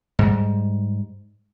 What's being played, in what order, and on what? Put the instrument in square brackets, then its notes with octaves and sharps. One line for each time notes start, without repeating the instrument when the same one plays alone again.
[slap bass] G#2 G3